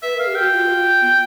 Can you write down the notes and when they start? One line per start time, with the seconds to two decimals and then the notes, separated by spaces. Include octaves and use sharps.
0.03 B4 E5
0.15 A#4
0.20 F5
0.27 G4
0.36 F#4 G5
0.52 F4
1.01 B3